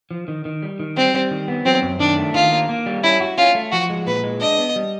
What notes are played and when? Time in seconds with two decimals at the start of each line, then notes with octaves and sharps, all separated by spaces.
0.11 F3
0.28 D#3
0.45 D#3
0.63 G3
0.80 D#3
0.97 G3 C4
1.14 G3
1.31 D#3
1.48 B3
1.66 F#3 C4
1.82 F#2
2.00 D#3 D4
2.17 A3
2.34 D#3 F4
2.52 A#3
2.69 A#3
2.86 G3
3.04 C#4 E4
3.20 F#4
3.38 C#4 F4
3.55 A3
3.72 F3 F#4
3.90 G#3
4.07 A#2 B4
4.24 G#3
4.41 D4 D#5
4.58 B3
4.76 G3